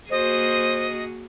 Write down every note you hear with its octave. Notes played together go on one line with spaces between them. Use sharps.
A#3 F#4 G#4 C5 D#5